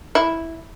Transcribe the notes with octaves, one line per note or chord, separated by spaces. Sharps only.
E4